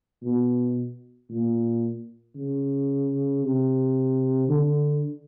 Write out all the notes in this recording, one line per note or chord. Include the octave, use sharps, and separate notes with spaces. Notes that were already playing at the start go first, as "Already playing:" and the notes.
B2
A#2
C#3
C3
D3